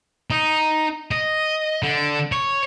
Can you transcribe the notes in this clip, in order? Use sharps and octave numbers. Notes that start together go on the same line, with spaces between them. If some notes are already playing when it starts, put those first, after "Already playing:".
D#4
D#5
D3
C#5